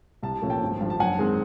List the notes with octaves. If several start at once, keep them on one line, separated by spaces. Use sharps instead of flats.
C2 A5
A#2 F3 A3 C#4
G5 A5
G#1
G2 D3 F3
A5
F#2 F#5 G#5
D#3 G#3 C4